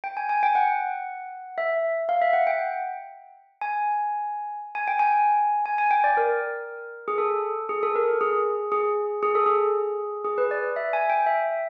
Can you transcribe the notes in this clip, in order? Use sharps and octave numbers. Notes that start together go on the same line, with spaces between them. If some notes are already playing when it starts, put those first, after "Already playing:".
G5
G#5
G#5
G5
F#5
E5
F5
E5
F#5
G5
G#5
G#5
G5
G#5
G#5
G#5
G5
D5
A#4
G#4
A4
G#4
A4
A#4
G#4
G#4
G#4
A4
G#4
G#4
B4
D5
E5
G#5
G5
E5